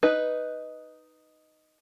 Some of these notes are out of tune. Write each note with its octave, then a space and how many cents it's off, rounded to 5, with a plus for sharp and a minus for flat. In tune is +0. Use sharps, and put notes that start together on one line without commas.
D#4 +0 B4 +0